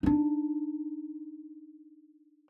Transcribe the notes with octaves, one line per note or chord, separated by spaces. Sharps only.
D4 D#4